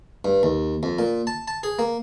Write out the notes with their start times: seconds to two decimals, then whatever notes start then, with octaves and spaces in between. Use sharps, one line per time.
0.25 G2
0.43 D#2
0.83 F2
0.99 A#2
1.27 A5
1.48 A5
1.63 G#4
1.79 A#3